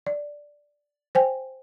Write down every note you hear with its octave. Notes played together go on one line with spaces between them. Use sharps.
D5
C5 G5 G#5